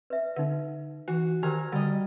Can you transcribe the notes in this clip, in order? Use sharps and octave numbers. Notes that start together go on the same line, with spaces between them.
B4 E5
D3 D#4 B4
E3 F#4
D#3 G4 A#4 C5 G#5 A#5 F6
D3 G3 D#5